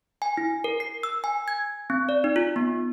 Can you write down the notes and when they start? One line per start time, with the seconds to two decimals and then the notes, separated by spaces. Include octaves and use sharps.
0.22 G#5
0.37 E4
0.64 A#4
0.80 C7
1.03 E6
1.24 G#5
1.48 G#6
1.90 C4
2.09 D5
2.24 D#4
2.36 F4
2.56 B3